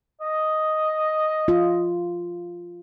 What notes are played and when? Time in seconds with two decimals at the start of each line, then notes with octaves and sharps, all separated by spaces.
0.21 D#5
1.48 F4